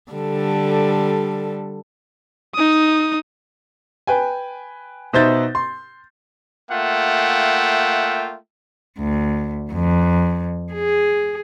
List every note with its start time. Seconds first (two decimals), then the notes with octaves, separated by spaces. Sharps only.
0.12 D3 G3 A4
2.55 D#4 D#6
4.07 B4 G5 G#5
5.13 B2 D#4 C5 E5 G6 A6
5.55 C6
6.70 A3 A#3 F4 E5 F#5 G5
8.99 D2
9.72 F2
10.73 G#4